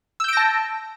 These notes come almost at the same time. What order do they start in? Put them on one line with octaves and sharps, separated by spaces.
E6 G6 D7 A#6 A5